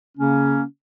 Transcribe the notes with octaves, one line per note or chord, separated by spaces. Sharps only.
C#3 A#3 C#4